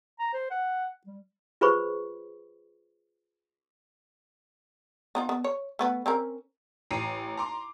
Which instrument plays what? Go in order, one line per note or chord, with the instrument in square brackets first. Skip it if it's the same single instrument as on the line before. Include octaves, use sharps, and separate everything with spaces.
[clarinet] A#5
C5
F#5
G3
[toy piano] F4 G#4 B4 C5 B5 C#6
[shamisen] B3 D#4 F4
B3
C#5
A3 B3 B4
C4 C#4 A#4
[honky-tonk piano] A1 A#5 C7 D#7
A#5 C6 D6